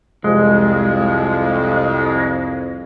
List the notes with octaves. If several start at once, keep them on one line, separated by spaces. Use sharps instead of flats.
C2 F2 G#3